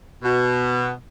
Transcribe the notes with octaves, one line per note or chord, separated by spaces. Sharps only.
B2